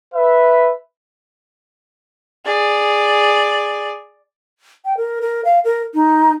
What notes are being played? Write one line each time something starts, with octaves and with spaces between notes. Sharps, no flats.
B4 E5
G#4 D5
G5
A#4
A#4
F5
A#4
D#4